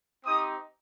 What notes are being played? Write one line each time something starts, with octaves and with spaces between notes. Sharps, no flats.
C4 D#4 G4 D#6